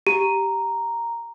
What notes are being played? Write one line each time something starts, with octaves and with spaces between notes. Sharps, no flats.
G4 A#5